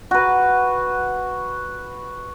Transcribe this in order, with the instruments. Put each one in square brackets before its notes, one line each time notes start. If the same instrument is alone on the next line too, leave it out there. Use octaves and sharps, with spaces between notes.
[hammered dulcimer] F#4 B4